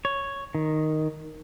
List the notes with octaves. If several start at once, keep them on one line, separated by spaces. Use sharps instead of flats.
C#5
D#3